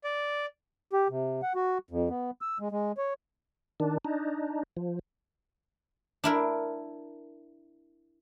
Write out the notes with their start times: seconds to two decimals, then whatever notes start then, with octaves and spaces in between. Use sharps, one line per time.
0.04 D5
0.93 G4
1.09 C3
1.43 F#5
1.55 F#4
1.91 F2
2.10 B3
2.41 E6
2.60 G#3
2.71 G#3
2.98 C#5
3.80 D#3 D4
4.05 D4 D#4
4.77 F3
6.24 D4 E4 A#4